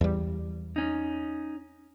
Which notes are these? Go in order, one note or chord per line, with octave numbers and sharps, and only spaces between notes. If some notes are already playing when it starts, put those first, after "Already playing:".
E2 G3
C#4 D#4